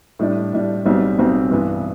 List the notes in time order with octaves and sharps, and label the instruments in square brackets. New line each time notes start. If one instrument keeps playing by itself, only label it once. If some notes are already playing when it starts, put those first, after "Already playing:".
[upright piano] A2 G3 D4
A2 G3 D4
B1 B2 G3 C4
B1 B2 G3 C4
G2 E3 B3